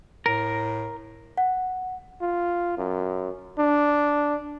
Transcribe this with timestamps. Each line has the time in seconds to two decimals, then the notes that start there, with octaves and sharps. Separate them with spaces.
0.26 A2 A#4
1.38 F#5
2.21 F4
2.77 F#2
3.58 D4